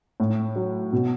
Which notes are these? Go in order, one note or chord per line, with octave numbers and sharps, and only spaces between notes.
A2
F#3
B2